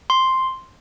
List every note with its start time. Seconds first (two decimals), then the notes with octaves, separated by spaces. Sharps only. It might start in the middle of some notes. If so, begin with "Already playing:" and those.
0.10 C6